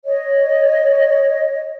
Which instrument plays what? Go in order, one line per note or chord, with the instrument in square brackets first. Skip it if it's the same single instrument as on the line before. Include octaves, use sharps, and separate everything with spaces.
[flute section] C#5 D#5